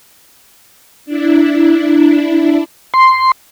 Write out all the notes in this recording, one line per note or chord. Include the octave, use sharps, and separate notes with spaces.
D4 E4
C6